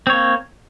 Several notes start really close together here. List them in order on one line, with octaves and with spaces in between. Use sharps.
C4 C#5 A#3